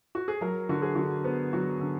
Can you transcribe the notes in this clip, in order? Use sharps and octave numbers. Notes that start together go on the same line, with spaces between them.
F#4
G#4
F#3 A#4
D3 F#4
G#4
D3 F#4
B3
F#3 F#4
D3